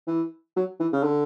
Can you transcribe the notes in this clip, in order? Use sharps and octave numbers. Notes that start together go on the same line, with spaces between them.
E3
F#3
E3
C#3
D3